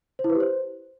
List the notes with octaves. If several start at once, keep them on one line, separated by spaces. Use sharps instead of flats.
C5
E4
B4
G4
C5